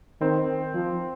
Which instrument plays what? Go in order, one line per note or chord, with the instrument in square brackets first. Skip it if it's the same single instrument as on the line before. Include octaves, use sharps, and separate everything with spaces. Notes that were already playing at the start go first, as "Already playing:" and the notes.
[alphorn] D#3 [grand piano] C4
[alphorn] F3